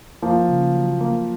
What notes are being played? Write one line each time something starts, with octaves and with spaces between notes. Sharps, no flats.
F3 A#3
C#3
F#3
A#3